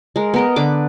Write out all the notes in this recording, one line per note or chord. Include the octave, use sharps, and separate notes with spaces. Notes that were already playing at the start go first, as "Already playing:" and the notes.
G#3 A#4
B3 A#4 D#5
D3 B4 D6